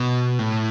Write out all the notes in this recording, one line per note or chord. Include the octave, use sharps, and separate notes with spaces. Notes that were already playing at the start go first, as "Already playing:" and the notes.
Already playing: B2
A2